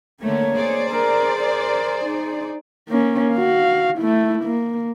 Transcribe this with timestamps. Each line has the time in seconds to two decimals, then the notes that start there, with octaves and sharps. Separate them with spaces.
0.23 D3 A3 A#3 C#5
0.54 G#4 C5 D5
0.90 A#4
1.40 A#4
2.05 D#4
2.89 A#3 C#4
3.34 F#4 F5
3.98 A3 E4
4.44 A#3